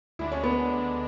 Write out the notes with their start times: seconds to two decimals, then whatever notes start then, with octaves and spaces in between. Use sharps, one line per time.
0.19 D2 D3 G#3 D4 E4
0.32 C#4
0.43 B3